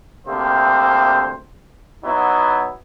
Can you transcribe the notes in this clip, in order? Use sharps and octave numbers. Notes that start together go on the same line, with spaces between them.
D2 C3 A#3 C4 C5
F#3 B3 D#4 E4